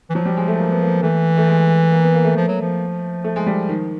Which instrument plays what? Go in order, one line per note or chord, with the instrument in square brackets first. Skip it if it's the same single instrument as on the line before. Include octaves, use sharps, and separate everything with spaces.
[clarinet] E3
[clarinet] F3 [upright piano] F#3
[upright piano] G3
G#3
A3
A#3
B3
A#3
[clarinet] E3 [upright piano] A3
[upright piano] A3
G#3
A#3
B3
A#3
A3
[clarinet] F3
F#3
F3
[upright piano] A3
G#3
G3
D#3